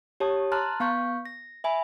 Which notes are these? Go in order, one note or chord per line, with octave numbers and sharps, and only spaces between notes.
G4 C#5 A5 D#6
A5 A#5 C6 F6 F#6 A6
B3 F5 C#6 G6
A#6
E5 G#5 B5